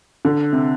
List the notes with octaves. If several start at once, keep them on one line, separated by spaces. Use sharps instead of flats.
D3
C3